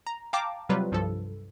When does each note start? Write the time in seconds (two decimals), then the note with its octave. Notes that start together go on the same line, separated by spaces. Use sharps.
0.07 A#5
0.33 F5 G5 A5 A#5 D6
0.69 C3 F#3 G3 F4 B4
0.92 C2 G2 F3 A4